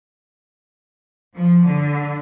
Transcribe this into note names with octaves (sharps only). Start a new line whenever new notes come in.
F3
D3